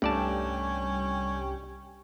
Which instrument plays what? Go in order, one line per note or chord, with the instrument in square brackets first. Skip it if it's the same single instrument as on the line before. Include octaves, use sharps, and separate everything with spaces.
[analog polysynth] C2 G3 G5 [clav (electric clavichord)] G2 D5 A5 [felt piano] A3 [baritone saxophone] C#4